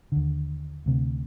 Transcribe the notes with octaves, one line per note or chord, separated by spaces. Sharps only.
D#2 D3
D2 C3